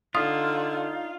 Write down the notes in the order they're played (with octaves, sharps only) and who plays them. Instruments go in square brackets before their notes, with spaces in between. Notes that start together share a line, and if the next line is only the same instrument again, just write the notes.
[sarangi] D3 [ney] D#4 [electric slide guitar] F4 [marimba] D#6